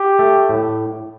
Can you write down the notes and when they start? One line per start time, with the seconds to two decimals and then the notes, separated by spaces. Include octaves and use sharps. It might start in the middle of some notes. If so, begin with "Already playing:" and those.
Already playing: G4
0.19 A3
0.49 A2